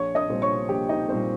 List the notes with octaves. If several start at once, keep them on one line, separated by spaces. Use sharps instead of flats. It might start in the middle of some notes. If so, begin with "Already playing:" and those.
Already playing: A#1 C#5 C#6
D#5 D#6
A#2 G3 C4
C#5 C#6
A#1 G4 G5
D#4 D#5
A#2 G3 C4 C5